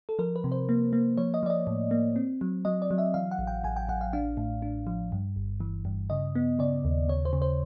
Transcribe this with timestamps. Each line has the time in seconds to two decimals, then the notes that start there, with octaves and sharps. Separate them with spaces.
0.09 A4
0.19 F3 A#4
0.36 B4
0.44 C3
0.52 C5
0.69 A#3
0.93 A#3
1.17 F3 C#5
1.34 D#5
1.43 F3 D5
1.50 D#5
1.67 A2
1.91 A#3
2.16 C4
2.41 F#3
2.65 F#3 D#5
2.82 D5
2.91 F#3
2.98 E5
3.14 E3 F5
3.31 F#5
3.39 A1
3.47 G5
3.64 A1 G#5
3.76 G5
3.89 A1 F#5
4.01 F5
4.13 D4 F5
4.37 A2
4.62 D4
4.87 F3
5.12 G2
5.36 G1
5.60 E3
5.85 G2
6.10 C#3 D#5
6.35 B3
6.59 C#3 D5
6.84 D#2
7.08 C#3 C#5
7.25 C5
7.33 C#3
7.42 C5